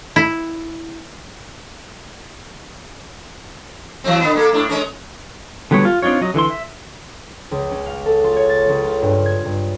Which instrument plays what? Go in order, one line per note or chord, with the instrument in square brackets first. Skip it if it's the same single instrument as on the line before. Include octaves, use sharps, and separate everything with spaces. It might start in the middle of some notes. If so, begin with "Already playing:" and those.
[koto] E4
[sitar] E3 F#3 C4
D3 B3
A#3 G#4 A4
A2 D4
G#3 C#4 A#4
[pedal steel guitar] D3 F#3 G3 B3 C#5
F4
C4 D4 D#4 F4 C#5
F#3 D#5
D3 E3 E4 C6
E5
[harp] C#2
C#4
F5
A4
F4
C#5
A6
C#2
F4
G2
G#6
G2